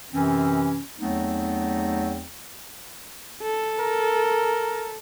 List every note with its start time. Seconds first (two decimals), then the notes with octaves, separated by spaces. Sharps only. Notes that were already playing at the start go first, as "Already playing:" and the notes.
0.12 F#2 C3 E3 C4 C#4
0.99 E2 F#3 A3 B3 C4 D#4
3.43 A4
3.80 A#4